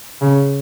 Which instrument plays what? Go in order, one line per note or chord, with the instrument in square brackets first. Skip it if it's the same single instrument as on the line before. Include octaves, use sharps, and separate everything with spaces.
[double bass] C#3